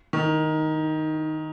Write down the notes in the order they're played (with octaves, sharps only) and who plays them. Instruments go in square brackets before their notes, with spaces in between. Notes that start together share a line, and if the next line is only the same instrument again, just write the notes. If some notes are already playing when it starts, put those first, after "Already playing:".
[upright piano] D#3